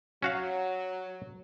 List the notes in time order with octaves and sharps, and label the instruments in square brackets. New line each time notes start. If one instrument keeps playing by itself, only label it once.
[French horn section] F#3 [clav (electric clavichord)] C#4 F#4 F5